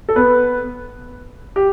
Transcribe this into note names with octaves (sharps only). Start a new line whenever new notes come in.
A4
B3 B4
G4